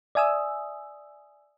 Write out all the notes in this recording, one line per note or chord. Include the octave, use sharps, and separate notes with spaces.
D5 E5 G#5 D#6 E6